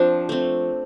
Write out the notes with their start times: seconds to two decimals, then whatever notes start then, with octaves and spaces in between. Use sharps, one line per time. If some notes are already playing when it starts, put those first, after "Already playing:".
Already playing: F3 C4 D4
0.29 A3 C4